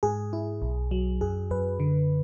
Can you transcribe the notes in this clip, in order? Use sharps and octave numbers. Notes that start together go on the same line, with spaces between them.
G#2 G#4
E4
B1
F#3
F#2 G#4
F#2 B4
D3